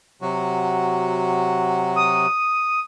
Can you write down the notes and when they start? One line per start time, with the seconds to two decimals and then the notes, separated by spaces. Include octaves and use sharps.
0.22 C3 F#3 F#4
1.96 D#6